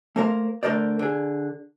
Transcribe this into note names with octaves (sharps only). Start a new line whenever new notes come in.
A3 A#3 A#4 C5 F5
D3 A3 A#4 C5 D5
D3 G#4